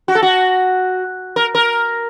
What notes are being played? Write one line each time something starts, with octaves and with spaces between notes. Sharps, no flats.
F#4
A4
F#4
A#4
A#4